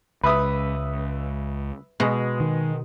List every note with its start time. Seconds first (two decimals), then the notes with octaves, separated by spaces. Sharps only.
0.23 C#2 B4 E5 D#6
2.00 B2 G#3
2.40 D#3